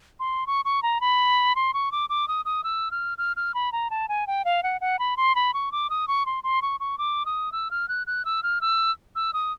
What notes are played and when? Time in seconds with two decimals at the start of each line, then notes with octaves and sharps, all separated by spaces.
0.20 C6
0.47 C#6
0.65 C#6
0.83 A#5
1.01 B5
1.56 C6
1.74 C#6
1.92 D6
2.10 D6
2.28 D#6
2.45 D#6
2.64 E6
2.91 F6
3.18 F6
3.37 F6
3.54 B5
3.72 A#5
3.90 A5
4.09 G#5
4.27 G5
4.45 F5
4.63 F#5
4.81 F#5
4.99 B5
5.17 C6
5.35 B5
5.54 C#6
5.72 D6
5.90 D#6
6.08 C#6
6.26 C6
6.44 C6
6.62 C#6
6.80 C#6
6.98 D6
7.26 D#6
7.52 E6
7.71 F6
7.89 F#6
8.07 F#6
8.25 E6
8.43 F6
8.61 E6
9.16 E6
9.34 D#6